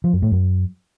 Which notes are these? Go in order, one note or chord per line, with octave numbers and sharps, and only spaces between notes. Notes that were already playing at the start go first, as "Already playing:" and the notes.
F3
F#2
A2
F#2